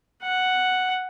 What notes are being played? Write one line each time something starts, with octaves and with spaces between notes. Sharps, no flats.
F#5